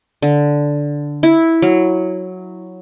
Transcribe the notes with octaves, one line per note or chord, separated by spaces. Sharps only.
D3
E4
F#3